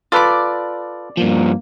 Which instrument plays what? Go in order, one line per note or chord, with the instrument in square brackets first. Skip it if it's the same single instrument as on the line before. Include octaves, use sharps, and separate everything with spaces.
[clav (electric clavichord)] F4 A4 B4 [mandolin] D5 D6
[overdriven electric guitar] G2 F3 [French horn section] A#3